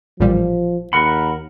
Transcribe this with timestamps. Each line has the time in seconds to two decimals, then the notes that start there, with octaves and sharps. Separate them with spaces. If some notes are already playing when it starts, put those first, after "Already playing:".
0.20 A1 A#2 F3 G3
0.93 D#2 A#4 F#5 B5